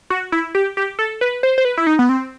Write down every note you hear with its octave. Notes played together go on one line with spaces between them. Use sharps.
F#4
E4
G4
G4
A4
B4
C5
C5
B4
E4
D#4
B3
C4